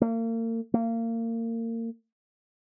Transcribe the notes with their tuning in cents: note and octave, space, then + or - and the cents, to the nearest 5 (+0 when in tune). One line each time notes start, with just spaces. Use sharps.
A#3 -40
A#3 -30